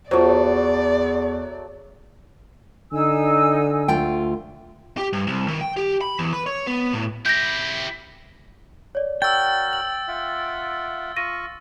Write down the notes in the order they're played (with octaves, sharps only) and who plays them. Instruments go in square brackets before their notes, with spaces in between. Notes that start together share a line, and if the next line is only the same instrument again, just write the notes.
[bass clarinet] E2 [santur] F#3 A3 [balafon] F4 C5 [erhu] D5
[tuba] D3 [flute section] D#4 G#5 E6
[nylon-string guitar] D2 F4 G5
[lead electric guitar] G4
G2
C2
D#3
G5
G4
B5
E2
B4
C#5
B3
A2
[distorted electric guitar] E4 G4 [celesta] G6 A#6
[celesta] C#5 D5
[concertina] F#4 A#4 [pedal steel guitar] G5 [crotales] E6 A6
[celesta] F#7
[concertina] F4 E5 F#5
[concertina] F4 C#6 [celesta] A#6 D#7